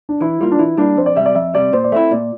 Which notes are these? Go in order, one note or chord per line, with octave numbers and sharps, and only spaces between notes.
D4
E3 E4
G3 A#3 F4
D4
E3 E4
G3 A#3 D4
F2 C5
D5
C3 G3 E5
D5
F2 E5
C3 G3 D5
A#2 C5
D5
A3 C4 E4 E5
A#2 D5